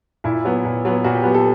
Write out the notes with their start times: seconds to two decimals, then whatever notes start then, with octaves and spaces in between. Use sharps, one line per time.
0.24 A#2 E4
0.45 F#3 B3
0.65 A#2
0.85 F#3 B3
1.04 A#2 F#4
1.15 G4
1.24 F#3 B3
1.34 A4